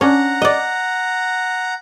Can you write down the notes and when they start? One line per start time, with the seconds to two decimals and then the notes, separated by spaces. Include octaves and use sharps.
0.01 C#4 D4 F#5 A#5
0.42 D5 D#5